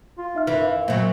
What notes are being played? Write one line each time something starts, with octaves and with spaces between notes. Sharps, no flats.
F4
D#4 E5 F6
F#2 E3
F5
A#2 F#3 C5